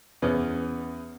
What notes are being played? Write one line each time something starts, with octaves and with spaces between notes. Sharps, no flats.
E2 B3 C#4